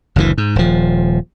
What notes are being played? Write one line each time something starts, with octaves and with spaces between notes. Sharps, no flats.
F#1 D2 B2 E3
G#2
D#1 F3